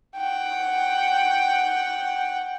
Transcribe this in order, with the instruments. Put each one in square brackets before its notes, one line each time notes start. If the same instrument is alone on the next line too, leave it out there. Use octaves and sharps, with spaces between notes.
[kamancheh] F#5 G5